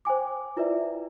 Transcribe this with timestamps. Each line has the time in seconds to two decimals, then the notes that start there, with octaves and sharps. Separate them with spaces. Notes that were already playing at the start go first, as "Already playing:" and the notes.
0.05 C5 G5 G#5 D6
0.57 E4 F4 B4 C5 D5 E5